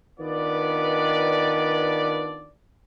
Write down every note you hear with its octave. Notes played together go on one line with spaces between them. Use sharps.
D#3 B3 D4 F4 B4 D5